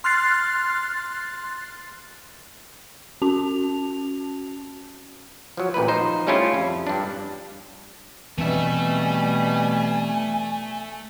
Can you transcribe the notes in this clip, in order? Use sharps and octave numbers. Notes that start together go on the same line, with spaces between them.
C6 F6 F#6 A6 C7
C#4 F#4 A5 F7
F3 F#3
A1 A#2 E4 B4
F3 D#4 C5
G3 A3 C#4 E4 F4 G#4
F2
G2 D4
B2 E3 G3 A3 C4 D4 E5 G#5